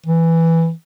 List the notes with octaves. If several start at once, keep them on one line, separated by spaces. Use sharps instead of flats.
E3